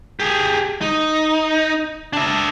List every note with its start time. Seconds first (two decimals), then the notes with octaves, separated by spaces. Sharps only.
0.20 G4 G#4
0.81 D#4
2.13 D4 E5